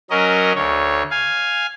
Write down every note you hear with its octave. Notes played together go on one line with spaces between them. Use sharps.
F#3 C#4 A#4 D#5
D2 C#5
F5 G#5